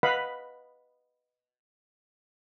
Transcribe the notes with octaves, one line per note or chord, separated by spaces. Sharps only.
B4 D#5 F5 F#5 B5